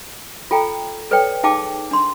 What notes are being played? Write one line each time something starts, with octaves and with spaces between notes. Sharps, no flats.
F4 A4 G5 G#5 A#5
A4 B4 C#5 D5 G5
D#4 G#4 F5 G5 A5 D6
D4 C6